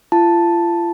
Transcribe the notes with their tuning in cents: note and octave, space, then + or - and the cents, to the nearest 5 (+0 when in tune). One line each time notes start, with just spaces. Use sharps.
F4 -40 A5 +0